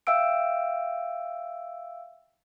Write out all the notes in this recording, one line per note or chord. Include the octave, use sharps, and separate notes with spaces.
E5 F5 G5 E6 D7